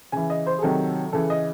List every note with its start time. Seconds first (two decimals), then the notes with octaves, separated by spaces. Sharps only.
0.12 C#3 E3 G#5
0.30 D#5
0.46 C5
0.59 G#4
0.62 C3 D#3 F#3 A4
1.13 C#3 E3 A4
1.30 D#5